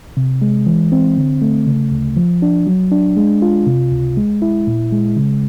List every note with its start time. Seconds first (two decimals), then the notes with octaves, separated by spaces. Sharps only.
0.17 C3
0.42 G#3
0.66 E3
0.92 C4
1.17 D3
1.42 A3
1.67 C#3
1.92 D2
2.17 F3
2.42 D4
2.67 F#3
2.92 D4
3.17 G#3
3.42 F4
3.67 C3
3.92 C#2
4.17 G#3
4.42 E4
4.67 A#2
4.92 G#3
5.17 C#3